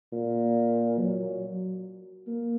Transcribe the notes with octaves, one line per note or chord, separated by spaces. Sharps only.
A#2
F#3
A#3